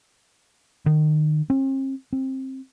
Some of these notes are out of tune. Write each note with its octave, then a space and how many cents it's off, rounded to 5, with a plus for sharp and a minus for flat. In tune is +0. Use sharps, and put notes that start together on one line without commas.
D#3 -30
C4 +45
C4 +20